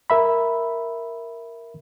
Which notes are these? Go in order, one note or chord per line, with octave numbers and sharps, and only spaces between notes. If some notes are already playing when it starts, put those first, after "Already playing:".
A#4 E5 B5